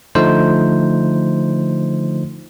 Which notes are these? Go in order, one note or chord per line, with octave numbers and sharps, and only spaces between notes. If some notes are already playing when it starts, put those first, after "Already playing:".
D3 F3 A3 D#4 C5